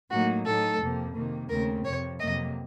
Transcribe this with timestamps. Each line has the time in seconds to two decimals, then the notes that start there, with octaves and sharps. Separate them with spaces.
0.11 A2 F#3 A#3 D#4 F#4
0.45 A2 F#3 A3 D#4 A4
0.80 F2 C3 F3 A#3
1.14 C3 D#3 A#3
1.49 D#2 C#3 A3 C4 A#4
1.84 F2 C3 F3 C#5
2.19 F2 C3 F#3 A#3 D#5